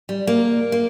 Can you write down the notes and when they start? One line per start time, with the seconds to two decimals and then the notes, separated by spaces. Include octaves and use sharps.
0.09 G3
0.27 A#3
0.72 A#3